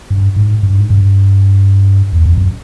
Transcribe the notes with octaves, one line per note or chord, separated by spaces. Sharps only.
G2
G#2
G2
G#2
G2
E2
F2
F#2